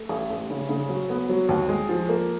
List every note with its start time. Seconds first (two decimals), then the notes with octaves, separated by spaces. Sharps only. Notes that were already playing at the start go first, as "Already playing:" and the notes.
Already playing: A3
0.09 A1
0.30 A1
0.50 C#3
0.69 C#3
0.89 F#3
1.10 B3
1.29 F#3
1.49 D#2
1.69 G#3
1.89 F3
2.09 A#3